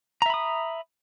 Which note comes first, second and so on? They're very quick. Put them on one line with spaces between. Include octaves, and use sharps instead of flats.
A#5 E5 B5 D#6